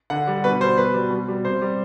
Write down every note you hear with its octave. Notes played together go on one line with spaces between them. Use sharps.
D3 F#5
G3
B2 B4
G3 C5
B2 B4
G3
B2
G3
C3 C5
G3